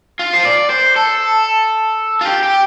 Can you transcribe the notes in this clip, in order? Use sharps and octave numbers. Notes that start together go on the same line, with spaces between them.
F4
C5
D5
C5
A4
F4
G4
G4